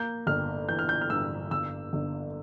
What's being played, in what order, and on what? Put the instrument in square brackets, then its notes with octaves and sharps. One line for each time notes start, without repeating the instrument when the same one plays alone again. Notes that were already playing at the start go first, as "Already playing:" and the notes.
Already playing: [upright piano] A#3 [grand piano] G6
[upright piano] G1 [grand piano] F6
[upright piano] E3 [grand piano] G6
[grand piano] F6
G6
F6
[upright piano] G2 [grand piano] E6
[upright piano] G1 [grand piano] E6
[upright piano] G1